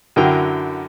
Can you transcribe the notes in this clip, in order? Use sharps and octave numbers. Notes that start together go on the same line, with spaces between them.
F#2 D3 F#3 E4 A#4 G5